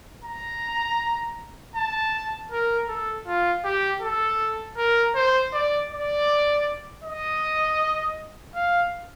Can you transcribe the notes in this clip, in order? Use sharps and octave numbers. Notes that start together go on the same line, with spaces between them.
A#5
A5
A#4
A4
F4
G4
A4
A#4
C5
D5
D5
D#5
F5